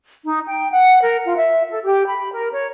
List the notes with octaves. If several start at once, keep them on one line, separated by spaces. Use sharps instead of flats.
D#4
G5
F#5
A#4
F4
E5
A4
G4
B5
A#4
C#5